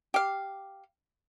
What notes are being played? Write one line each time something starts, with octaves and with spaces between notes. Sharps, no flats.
G4 F5